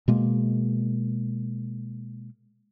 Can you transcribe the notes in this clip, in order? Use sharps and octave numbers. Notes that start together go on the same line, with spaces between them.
B2 G#3 A#3